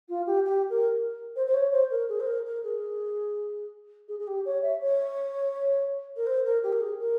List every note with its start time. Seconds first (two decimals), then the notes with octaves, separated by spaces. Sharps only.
0.09 F4
0.26 G4
0.45 G4
0.70 A#4
1.36 C5
1.46 C5
1.54 C#5
1.72 C5
1.90 A#4
2.09 G#4
2.20 C5
2.26 A#4
2.45 A#4
2.63 G#4
4.08 G#4
4.19 G#4
4.27 G4
4.45 C#5
4.62 E5
4.81 C#5
6.16 A#4
6.26 C5
6.45 A#4
6.63 G4
6.72 A#4
6.81 G#4
7.00 A#4